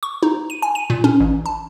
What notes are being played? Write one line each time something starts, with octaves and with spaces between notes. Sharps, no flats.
C#6
D#4
D#7
G#5
D#7
A#2
C#4
A1
A5